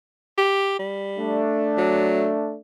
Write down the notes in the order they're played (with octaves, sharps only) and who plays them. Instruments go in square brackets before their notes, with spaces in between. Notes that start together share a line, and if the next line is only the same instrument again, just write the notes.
[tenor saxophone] G4
G3
[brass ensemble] A3 D4
[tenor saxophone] F#3